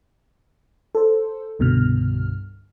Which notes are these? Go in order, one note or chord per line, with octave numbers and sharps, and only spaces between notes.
A4 C5
C2 G2 B2 D3 F6